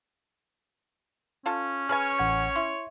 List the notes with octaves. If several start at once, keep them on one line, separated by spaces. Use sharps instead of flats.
C#4 F4 A4
G#4 B4 C#5 G#5 F6
A1 F#5 G#6
E4 C6